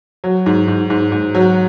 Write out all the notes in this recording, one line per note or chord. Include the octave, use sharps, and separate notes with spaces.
F#3
G#2
G#2
G#2
G#2
F#3